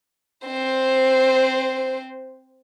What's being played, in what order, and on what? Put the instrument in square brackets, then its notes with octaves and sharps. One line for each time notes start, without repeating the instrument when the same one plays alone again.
[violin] C4 C5